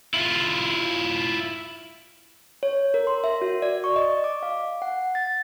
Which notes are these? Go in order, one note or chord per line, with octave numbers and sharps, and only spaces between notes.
E4 F4
C#5
A#4
C6
E5
F#4
D5
C#6
D#5
D6
F5
F#5
A6